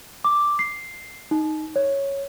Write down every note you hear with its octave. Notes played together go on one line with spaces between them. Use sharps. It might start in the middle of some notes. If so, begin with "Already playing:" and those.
D6
C7
D#4
C#5